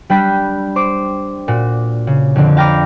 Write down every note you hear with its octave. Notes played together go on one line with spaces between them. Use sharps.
G3 D4 G5 B5 F#6 B6
C5 D6
A#2 F#4
C#3
F2 D3 C4
F5 G5 A#5 B5 D6 F6